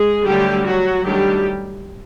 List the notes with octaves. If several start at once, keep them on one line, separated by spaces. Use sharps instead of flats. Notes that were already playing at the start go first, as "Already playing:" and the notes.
Already playing: G#3 G#4
D3 F#3 G3 A3 G4
F#3 F#4
D#3 F#3 G3 A3 D4 G4